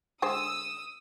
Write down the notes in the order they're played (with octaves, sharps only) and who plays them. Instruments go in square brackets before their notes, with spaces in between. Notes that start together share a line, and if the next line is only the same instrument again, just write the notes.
[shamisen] D3 G#3 C5 [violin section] D#6 E6